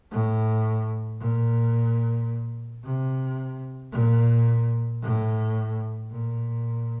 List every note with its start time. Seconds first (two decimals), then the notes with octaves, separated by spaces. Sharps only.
0.11 A2
1.21 A#2
2.84 C3
3.93 A#2
5.02 A2
6.11 A#2